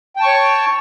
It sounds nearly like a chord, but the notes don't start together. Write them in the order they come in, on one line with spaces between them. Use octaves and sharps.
G5 A5 C#6 C#5